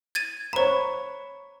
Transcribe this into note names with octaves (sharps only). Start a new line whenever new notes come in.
G#6 A6 D#7
C5 C#5 A#5 B5